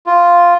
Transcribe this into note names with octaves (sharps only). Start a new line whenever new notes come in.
F4